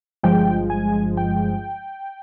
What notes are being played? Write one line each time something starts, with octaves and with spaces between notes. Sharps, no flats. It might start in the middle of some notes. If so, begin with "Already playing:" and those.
G1 G2 F3 G#3 G5
G#5
G5